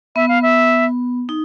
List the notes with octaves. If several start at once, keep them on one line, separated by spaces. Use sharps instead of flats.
B3 E5
F5
E5
D#4